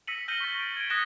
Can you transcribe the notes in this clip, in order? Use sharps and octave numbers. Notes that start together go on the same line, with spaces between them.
E6 A#6 B6 C#7 D#7 F#7
F6 G6 A#6 D#7 F#7 G7
C#6 A6
D7
G#6 D7
D#6 F#6 G#6 A#6 C#7 E7